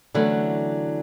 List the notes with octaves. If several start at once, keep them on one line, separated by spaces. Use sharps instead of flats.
D3 E3 F#3 A3 B3 C#4